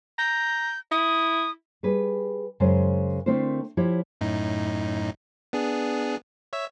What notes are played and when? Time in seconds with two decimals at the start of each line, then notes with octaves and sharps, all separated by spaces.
0.19 A#5 G6
0.91 E4 D#6
1.83 G3 G#4 B4
2.60 F#2 C#3 G#3 C5
3.26 D3 A3 C4 E4 A#4 C5
3.77 F3 E4 G4 C#5 E5
4.21 F#2 A2 D#4
5.53 B3 D4 G#4
6.53 C#5 E5 E6